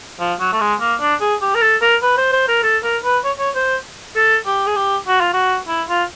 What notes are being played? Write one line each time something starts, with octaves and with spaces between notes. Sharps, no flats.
F3
F#3
A3
G#3
A#3
D4
G#4
G4
A#4
A4
A#4
B4
C5
C5
A#4
A4
A#4
B4
C#5
C#5
C5
A4
G4
G#4
G4
F#4
F4
F#4
E4
F4